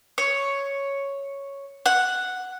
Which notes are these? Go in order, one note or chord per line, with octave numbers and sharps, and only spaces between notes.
C#5
F#5